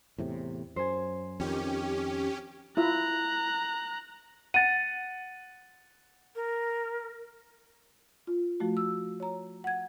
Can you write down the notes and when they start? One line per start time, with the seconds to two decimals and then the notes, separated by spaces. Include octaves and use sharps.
0.18 E2 A2 C3
0.76 F#2 C5 G#5
1.40 F2 D#3 C#4 G4
2.77 E4 F4 E5 A#5 F#6
4.54 F#5 A6 D#7
6.36 A#4
8.27 F4
8.60 F3 A3 F#4
8.77 E6
9.20 C#5 A#5
9.64 F#5 G#6